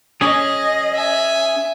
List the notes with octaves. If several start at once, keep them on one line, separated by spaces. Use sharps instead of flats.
C#4 G#4 D#5
E5 G#5